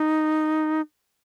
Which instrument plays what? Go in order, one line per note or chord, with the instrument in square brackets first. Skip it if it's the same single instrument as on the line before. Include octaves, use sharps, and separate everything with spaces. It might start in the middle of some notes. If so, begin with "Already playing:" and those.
Already playing: [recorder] D#4